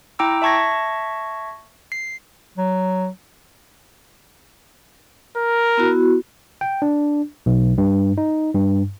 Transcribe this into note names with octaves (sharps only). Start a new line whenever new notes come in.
E4 G5 A#5 D6 E6
E5 A5 C#6 G#6 A#6
C7
F#3
A#4
B3 E4 F#4
G5
D4
B1
G2
D#4
G2